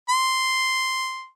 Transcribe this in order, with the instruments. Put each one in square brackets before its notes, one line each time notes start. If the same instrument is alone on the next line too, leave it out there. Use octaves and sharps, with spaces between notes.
[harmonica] C6